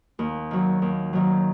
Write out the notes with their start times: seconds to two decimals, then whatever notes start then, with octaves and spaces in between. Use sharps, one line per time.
0.19 D#2
0.51 D#3 F#3
0.82 D#2
1.13 D#3 F#3